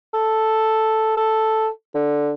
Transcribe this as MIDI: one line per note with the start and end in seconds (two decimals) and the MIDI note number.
0.14 1.15 69
1.17 1.68 69
1.94 2.32 50